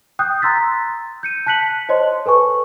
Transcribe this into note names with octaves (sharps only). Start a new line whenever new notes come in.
G5 D#6 F#6 G6
A#5 C6 E6 A6 B6
G6 C#7 D#7
A5 F#6 B6 C#7 F#7
C5 C#5 D#5 A5 C6
A4 B4 G#5 C#6